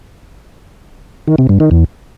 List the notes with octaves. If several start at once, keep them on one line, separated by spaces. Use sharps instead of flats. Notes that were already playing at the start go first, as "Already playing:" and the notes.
D#3
C3
G2
D#3
E2